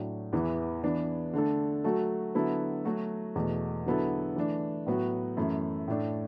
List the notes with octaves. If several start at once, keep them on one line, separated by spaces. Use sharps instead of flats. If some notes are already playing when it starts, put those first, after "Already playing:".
Already playing: A2 F#3 D4
E2 E3 B3 E4
E3 B3 D4
D3 A3 D4 A4
F#3 A3 F#4 A4
D3 F#3 B3 E4 A4
F#3 A3 F#4
E2 B2 A3
D3 F#3 B3 E4 A4
E3 A3 D4
A2 F#3 B3 F#4
F#2 E3 A3 E4
A2 A3 D4 A4